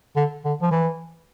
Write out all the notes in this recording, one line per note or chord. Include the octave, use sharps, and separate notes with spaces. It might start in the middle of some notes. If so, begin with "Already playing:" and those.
D3
D3
F3
E3